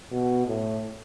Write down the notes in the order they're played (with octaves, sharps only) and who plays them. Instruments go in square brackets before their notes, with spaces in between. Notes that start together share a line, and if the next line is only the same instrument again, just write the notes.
[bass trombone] B2
A2